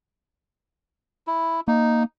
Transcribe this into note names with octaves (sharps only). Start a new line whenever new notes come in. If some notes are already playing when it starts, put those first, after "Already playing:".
E4
A#3 D#4